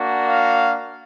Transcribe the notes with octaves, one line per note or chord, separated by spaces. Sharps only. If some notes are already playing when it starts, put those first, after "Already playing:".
Already playing: A#3 D4 F#4
F5